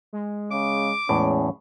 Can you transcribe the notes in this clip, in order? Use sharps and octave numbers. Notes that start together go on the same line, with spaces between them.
G#3
C#3 D6
E2 A2 G#3 C#4